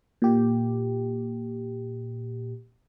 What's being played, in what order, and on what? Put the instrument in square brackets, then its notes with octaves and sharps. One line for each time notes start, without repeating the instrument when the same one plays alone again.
[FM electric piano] A#2 G4